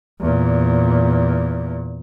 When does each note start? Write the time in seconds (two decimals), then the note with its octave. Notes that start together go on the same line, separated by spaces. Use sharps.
0.20 E2 A#2